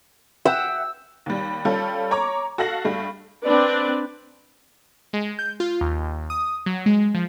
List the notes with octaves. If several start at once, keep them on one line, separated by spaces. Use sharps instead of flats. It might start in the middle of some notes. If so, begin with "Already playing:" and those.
E5 F#5 G5 E6
D#2 G3
G3 C#4 F4 A4
C#5 A#5 C#6 D6
F#4 A4 F5 F#5 A#6 F#7
G2 G3 A3
C4 D4 B4 D5
G#3
G6
F4
D#2
D#6
F#3
G#3
F3